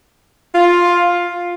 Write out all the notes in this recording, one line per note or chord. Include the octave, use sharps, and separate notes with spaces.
F4